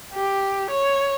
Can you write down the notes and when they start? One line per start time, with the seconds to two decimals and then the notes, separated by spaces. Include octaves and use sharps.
0.14 G4
0.70 C#5